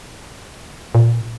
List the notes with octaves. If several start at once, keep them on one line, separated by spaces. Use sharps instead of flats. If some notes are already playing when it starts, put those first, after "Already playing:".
A#2